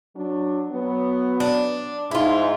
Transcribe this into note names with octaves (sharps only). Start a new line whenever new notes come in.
F#3 D4
F#3 B3
D4
G#2 E4 F4